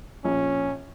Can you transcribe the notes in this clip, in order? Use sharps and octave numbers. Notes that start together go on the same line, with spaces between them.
A#1 C#4